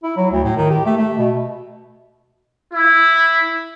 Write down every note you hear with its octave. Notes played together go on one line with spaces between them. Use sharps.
E4
F#3
D2
A2
D#3
G4
A3
A3
B2
E4